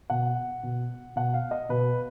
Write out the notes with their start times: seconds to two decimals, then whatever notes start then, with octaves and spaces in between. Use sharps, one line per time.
0.10 B2 F#5
0.63 B2
1.16 B2 F#5
1.34 F5
1.51 D#5
1.69 B2 B4